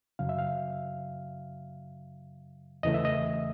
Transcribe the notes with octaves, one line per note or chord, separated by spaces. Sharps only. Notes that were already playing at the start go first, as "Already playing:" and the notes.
F#2 C#3 F#3 F5
E5
F5
E2 C#3 E3 A3 D#5
E5
D#5